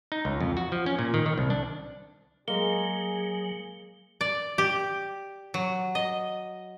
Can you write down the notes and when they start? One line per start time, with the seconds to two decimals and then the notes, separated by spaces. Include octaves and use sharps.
0.12 D#4
0.25 C#2
0.41 F2
0.57 F#4
0.72 F3
0.86 C#4
0.99 A#2
1.14 D#3
1.26 D#3
1.38 C2
1.50 D4
2.48 F#3 G#3 A#3 G#4 G7
4.21 D5
4.58 G4
5.54 F#3
5.95 D#5